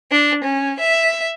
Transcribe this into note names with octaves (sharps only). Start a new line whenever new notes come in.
D4
C#4
E5